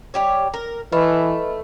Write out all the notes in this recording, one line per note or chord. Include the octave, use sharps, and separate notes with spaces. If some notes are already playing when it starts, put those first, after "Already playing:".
G3 G4 C#5
A#4
E3 A3 B4 D#5 B5